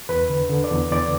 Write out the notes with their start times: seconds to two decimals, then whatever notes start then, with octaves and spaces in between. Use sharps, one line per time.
0.09 E2 B4
0.29 D3
0.50 D3
0.64 D5
0.71 E2
0.92 E2 D5